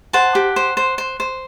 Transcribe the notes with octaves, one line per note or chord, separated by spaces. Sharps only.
C5 F#5 A5
G4
C5
C5
C5
C5